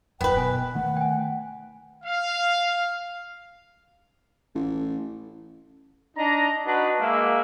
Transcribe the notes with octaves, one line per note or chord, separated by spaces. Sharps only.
D#1 F#2 B3 B4 G5
B2 G#5
D#3 A3 F#5
G5 G#5
F5
A1
D4 D#4 A#5
D4 D#4 F#4 B4
G#3 A#3 E5